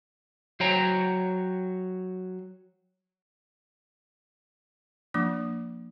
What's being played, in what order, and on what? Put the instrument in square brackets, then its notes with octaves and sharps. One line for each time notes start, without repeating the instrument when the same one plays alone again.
[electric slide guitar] F#3 C5 C#5 G5 A#5
[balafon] F3 A#3 D4 D6